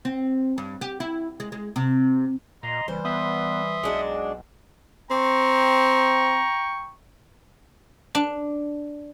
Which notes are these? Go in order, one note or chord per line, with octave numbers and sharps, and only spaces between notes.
C4
G2
G4
E4
G#3
G#3
C3
A#2 D#5 A#5 C6
F#1 E3 G3 C5
B3 E5 C6 D#6
B1 G#3 D4 F#4
C4 G5 A#5 C#6
D4